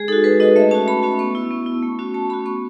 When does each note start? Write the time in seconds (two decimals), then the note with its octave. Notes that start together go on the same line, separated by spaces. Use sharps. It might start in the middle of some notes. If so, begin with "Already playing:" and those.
Already playing: G#3 G#4
0.08 D#4 F#4 A4
0.24 G#3 B4
0.40 D#4 F#4 D#5
0.56 A3 E5
0.71 C#4 F#4 A5
0.87 A3 B5
1.03 C#4 F#4
1.19 B3 C#6
1.35 E4
1.51 B3
1.66 E4
1.82 A3
1.99 C#4 F#4
2.14 A3 A5
2.30 C#4 F#4 B5
2.45 B3 C#6